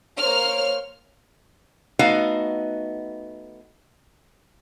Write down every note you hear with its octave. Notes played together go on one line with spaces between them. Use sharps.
A#3 C5 C#5 F6
A3 B3 D#4 F#4 D#5 F5